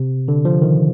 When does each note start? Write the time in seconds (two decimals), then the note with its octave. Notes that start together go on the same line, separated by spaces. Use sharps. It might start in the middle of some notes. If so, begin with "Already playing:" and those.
Already playing: C3
0.28 D3
0.45 F3
0.62 D#3